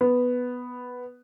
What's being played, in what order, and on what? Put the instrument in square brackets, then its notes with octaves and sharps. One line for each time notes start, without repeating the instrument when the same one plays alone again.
[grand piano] B3